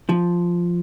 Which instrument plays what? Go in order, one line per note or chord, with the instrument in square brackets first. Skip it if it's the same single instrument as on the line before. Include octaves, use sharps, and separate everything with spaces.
[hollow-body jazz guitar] F3